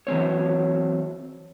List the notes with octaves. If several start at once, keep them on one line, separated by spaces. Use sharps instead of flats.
E3 F#3 C4 C#5